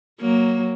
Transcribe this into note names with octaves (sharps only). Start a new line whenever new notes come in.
F#3 A#3